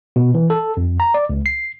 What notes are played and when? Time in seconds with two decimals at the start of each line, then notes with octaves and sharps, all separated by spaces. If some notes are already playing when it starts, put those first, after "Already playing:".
0.16 B2
0.34 E3
0.50 A4
0.77 F2
1.00 A#5
1.14 D5
1.29 C#2
1.46 C7